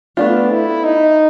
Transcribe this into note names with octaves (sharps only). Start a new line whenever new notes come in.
A3 B3 D4 F4
E4
D#4